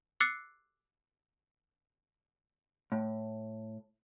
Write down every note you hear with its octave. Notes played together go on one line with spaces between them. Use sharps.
D6 E6 F#6 A6 C7 C#7
A2